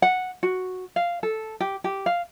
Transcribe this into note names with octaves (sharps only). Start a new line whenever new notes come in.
F#5
F#4
F5
A4
G4
G4
F5